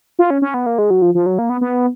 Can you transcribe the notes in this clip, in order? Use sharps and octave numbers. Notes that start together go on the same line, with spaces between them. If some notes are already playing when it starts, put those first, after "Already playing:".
F4
C#4
C#4
B3
A#3
G#3
F#3
F3
F3
F#3
A#3
B3
B3